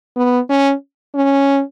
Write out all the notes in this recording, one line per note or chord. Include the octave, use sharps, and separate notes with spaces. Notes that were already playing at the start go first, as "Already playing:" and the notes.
B3
C#4
C#4